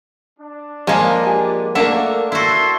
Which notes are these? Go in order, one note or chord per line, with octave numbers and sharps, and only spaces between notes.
D4
F3 G#3 A#3 A4 A#4 G#5
G4 G#5
A3 A#3 D4 A#4 E5 F#5
E4 F#4 E5 A5 C6